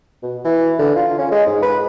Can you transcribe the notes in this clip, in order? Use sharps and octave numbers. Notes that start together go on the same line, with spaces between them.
B2
E3
D3
F4
C#4
G#3
G#2
B4